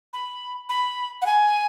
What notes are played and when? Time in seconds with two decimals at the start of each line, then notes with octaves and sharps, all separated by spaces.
0.13 B5
0.69 B5
1.22 F#5
1.26 G#5